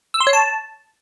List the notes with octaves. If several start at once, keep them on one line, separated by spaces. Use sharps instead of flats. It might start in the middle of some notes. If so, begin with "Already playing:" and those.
E6
C6
C#5
A5